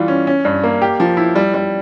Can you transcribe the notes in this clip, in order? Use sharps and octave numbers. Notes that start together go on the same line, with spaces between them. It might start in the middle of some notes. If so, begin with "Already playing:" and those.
Already playing: E3 G3 F4
C#4
C#4
G2
A#3
G4
F3
E4
G3
G3